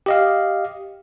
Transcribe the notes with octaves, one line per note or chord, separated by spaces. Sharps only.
G4 D#5 F5